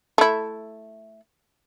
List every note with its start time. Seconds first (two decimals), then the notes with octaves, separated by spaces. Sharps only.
0.18 A3 E4